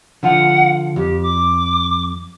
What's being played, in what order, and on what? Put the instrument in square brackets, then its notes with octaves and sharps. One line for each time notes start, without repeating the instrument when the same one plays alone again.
[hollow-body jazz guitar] D3 F3 F4 [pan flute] F#5
[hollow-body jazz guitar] F2 [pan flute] G4
[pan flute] D6